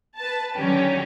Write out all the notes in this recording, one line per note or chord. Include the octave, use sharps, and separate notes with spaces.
B4 A5
D3 D#3 F#3 C#4 G4